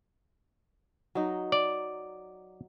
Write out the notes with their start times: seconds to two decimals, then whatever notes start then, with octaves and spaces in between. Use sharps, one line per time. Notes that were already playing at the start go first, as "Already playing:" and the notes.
1.15 F#3 D#4
1.52 D5